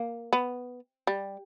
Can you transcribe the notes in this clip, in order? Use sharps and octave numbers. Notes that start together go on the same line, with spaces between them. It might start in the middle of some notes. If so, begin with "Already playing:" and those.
Already playing: A#3
B3
G3